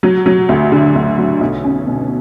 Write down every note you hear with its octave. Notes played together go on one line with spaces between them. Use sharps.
F#3
F#3
D2
D3
D2
F#3
B1
C#4
B2